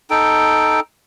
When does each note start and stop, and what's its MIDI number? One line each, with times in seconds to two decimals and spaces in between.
0.10 0.80 63
0.10 0.80 69
0.10 0.80 79